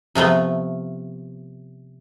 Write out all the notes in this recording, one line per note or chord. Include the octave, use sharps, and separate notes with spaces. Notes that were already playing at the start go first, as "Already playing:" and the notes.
C3 F3 A3 B3